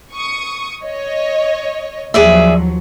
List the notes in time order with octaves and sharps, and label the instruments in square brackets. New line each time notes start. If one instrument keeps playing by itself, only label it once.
[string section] C#6 D#6
C#5 D#5
[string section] D#2 F3 F#3 [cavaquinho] G#4 D5 E5